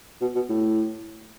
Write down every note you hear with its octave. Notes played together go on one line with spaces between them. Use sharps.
B2
B2
A2